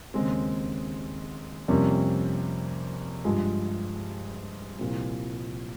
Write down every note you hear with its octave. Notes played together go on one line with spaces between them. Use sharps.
D#2 C#3 G#3 C4
F2 C3 G3 A#3 C#4
G2 F3 G#3
C2 A#2 F3 C4